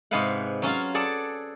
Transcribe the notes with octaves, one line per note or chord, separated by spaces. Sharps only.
G#2 C3 G#3 B4 F5 F#5
F#3 C#4 F4 F5
G#4 A4 D5 F#5 A5